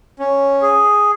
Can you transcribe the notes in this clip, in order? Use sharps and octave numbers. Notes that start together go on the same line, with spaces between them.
C#4
G#4